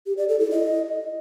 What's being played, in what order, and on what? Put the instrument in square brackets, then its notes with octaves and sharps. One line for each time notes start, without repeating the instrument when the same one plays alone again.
[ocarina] G4
D5
A4
E4
D#5